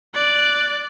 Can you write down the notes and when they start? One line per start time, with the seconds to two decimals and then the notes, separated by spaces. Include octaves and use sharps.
0.15 D5 F#6